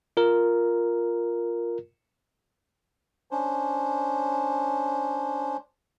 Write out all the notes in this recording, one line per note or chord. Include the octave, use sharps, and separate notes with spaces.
F4 A#4
C#4 D4 C5